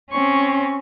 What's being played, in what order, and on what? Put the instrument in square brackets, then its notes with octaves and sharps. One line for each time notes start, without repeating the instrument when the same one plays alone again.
[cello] C4 C#4 [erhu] C#6